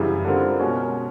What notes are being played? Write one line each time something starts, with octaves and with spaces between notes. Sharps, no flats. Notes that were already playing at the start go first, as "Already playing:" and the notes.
Already playing: F#2 C#3 E3 G3
D3 G3 C4 F4 A#4
B2 G#3 C#4 F#4 A#4